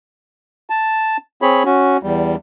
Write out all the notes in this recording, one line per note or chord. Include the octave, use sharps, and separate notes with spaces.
A5
C4 G#4 C#5 B5
C#4 F#4
E2 G3